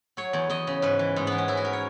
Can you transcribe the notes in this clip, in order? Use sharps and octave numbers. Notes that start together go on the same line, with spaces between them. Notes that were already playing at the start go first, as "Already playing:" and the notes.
F#3 C#5
E2
E2 D#5
C#3
G#2 B4
E3
G#2
E3 B3
C#4
E3 E4
F#4
A#4
C#5